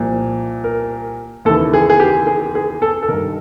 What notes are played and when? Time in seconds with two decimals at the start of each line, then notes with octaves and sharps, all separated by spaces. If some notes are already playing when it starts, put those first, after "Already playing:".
Already playing: C2 A#2 F3
0.64 A#4
1.45 D#2 C#3 E3 A4
1.74 G#4
1.90 G#4
2.00 G4
2.27 G#4
2.55 G#4
2.82 A4
3.03 A4
3.08 D#3 A#4
3.13 G2